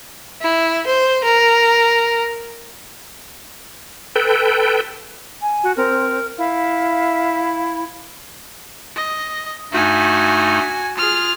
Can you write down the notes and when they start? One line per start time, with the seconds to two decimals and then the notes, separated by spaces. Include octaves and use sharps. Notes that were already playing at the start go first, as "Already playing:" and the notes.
0.41 E4
0.87 C5
1.24 A#4
4.15 A4 B4 G5
5.42 G#5
5.63 F#4
5.77 C4 A#4
6.38 E4 F5
8.96 D#5
9.72 G2 A3 D#4 F#4 G#5
10.97 F4 G#4 F6